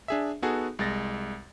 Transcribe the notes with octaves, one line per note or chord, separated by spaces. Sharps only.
D4 G#4 E5
B3 D#4 F#4 G#4 A4
C2 G#3 A6 A#6